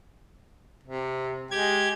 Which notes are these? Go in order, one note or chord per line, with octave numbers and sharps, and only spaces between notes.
C3
G#3 G4 G#6